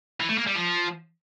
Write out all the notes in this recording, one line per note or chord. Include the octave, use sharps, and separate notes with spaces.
E3
A3
A#3
G3
F3